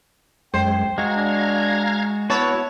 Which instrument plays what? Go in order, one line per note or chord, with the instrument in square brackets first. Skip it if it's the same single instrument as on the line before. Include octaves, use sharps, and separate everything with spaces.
[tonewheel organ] F#2 G#3 [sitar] C5 [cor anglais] G5
[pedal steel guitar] G#3 F#4 [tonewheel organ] F5 A#5 G#6
[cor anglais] D4
[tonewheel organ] B3 [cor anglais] E4 [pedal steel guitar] F#4 A5 [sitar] C#5